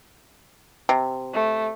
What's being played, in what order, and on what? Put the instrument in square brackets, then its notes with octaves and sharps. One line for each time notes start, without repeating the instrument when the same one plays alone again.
[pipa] C3
[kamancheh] A3